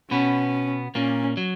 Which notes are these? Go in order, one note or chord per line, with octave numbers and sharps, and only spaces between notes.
B2 B3 C#4
A#2 A#3 C#4
F#3